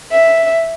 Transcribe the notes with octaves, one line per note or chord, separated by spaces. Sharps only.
E5